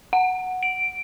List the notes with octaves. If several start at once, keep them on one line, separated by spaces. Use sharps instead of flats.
F#5
D7